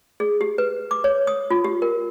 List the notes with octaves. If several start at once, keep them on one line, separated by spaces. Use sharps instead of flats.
G#4
G4
B4
D6
C#5
D#6
F4
G4
A#4